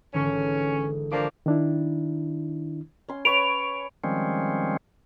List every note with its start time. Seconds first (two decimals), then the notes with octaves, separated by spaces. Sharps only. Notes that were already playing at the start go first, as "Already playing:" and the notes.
0.14 G#1 D3 E3 C#4
1.12 F3 A#3 D4 C#6 D6 B6
1.46 D#3 D4 E4
3.08 C#4 C6
3.25 B4 C#5 C#6 D7 F7
4.04 D#3 F3 G3 G#3 C4 C#4